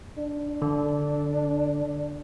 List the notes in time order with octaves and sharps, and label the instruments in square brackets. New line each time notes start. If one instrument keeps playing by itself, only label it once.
[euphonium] D4
[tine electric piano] D3